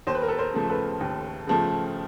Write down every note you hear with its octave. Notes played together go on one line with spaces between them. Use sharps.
D#2 C5
B4
A#4
A4 B4
A#4 C5
C#3 F3 A3
A4 B4
D#2
C#3 F3 A3